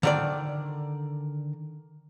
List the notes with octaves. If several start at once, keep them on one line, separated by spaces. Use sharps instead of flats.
D3 D#3 D5